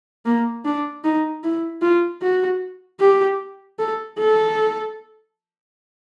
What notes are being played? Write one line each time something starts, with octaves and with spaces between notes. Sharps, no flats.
A#3
D4
D#4
E4
F4
F#4
G4
A4
A4